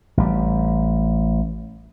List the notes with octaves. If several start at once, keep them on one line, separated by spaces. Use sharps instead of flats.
A1 G3